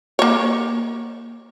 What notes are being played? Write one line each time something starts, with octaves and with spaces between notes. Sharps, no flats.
A#3 C#5